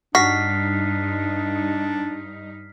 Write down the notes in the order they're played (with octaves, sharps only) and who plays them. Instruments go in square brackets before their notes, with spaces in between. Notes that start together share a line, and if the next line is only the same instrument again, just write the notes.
[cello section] G2 D#4 [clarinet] D4 [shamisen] F#4 [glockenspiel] F6 B6 C7